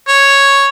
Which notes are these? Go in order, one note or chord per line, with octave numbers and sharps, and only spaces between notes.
C#5